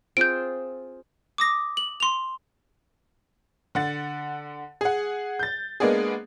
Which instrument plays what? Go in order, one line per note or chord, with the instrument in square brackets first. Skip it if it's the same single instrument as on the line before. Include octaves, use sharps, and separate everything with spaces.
[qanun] C4 F4 G#4 [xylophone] G6 D7
[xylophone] D6 D#6 A#6
F#7
C6 F7
[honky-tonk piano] D3 F#5 A6
G#4 F#5
G6 A6
G#3 A#3 B3 D4 G#4